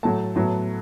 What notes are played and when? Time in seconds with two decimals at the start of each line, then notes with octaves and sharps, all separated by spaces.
0.03 A2 F#3 A3 A5
0.36 A2 F#3 B3